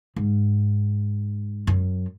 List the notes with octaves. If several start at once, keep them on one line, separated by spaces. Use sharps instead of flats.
G#2
F#2